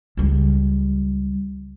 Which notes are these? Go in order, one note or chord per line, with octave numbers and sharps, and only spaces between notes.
C#2 G3